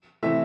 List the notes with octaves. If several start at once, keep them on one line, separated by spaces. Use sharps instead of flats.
C3 E3 A3 E5